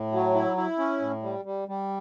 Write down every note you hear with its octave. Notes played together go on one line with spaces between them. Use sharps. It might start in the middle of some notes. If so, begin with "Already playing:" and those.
Already playing: A2
F#3
E4
E4
C#4
A2
G3
G3
G3